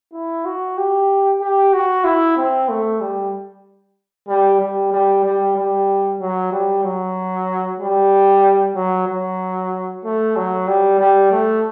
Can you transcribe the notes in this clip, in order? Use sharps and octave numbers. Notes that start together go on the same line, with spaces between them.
E4
F#4
G4
G4
F#4
E4
C4
A3
G3
G3
G3
G3
G3
G3
F#3
G3
F#3
G3
F#3
F#3
A3
F#3
G3
G3
A3